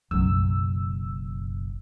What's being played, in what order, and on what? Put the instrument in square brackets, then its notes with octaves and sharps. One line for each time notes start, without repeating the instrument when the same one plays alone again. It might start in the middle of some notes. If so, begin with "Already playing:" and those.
[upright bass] F#1 B1 [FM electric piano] F#2 E6